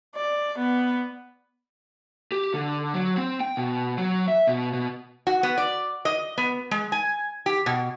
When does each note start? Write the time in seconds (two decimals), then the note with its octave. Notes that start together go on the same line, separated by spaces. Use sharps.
0.15 D5
0.58 B3
2.32 G4
2.54 D3
2.94 F#3
3.17 C4
3.40 G5
3.57 B2
3.98 F#3
4.28 E5
4.47 B2
4.74 B2
5.27 F#4
5.43 B3
5.58 D5
6.05 D#5
6.38 B3
6.71 G#3
6.92 G#5
7.46 G4
7.66 B2